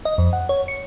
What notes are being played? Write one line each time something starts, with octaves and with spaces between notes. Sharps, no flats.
D#5
F2
F#5
C#5
C#7